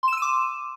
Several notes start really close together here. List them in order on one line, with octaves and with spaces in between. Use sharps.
C6 E7 E6 D#7 D6